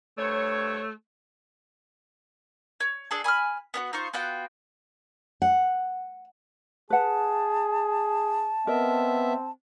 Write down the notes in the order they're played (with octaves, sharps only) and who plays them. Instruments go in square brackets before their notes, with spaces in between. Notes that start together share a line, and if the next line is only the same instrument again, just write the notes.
[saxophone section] G2 C5 C#5 [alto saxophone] A3
[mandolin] C#5
D4 G#4 A4
G#5 B5 D#6 F6
B3 D4 F#4
D#4 F4 C5 C#6
B3 F4 F#4 G5
[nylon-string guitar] F#5
[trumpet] G#4 [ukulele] B4 F#5 [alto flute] A5
[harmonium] B3 E5 [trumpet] C4 [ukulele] A#4 D#5